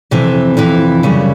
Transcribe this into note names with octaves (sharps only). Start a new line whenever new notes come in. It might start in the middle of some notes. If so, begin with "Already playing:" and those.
F2 C3 E3
F2 C3 E3
F#2 C#3 E3 G3